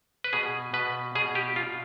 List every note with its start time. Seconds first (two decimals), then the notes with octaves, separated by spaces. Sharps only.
0.24 B4
0.33 B2 G#4
0.74 B2 B4
1.15 B2 G#4
1.35 G4
1.56 B2 F4